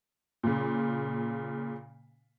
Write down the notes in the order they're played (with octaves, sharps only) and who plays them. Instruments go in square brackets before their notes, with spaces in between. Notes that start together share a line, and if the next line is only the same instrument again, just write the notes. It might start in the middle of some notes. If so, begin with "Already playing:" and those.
[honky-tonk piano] A#2 C#3